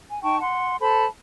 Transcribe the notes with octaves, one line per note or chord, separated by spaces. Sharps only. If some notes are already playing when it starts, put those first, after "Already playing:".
G#5
D#4 G5 A5 C#6
F#5 C6
A4 C5 A5 B5